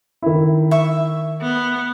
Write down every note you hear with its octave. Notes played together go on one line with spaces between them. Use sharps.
D#3 E4
E5 C#6
B3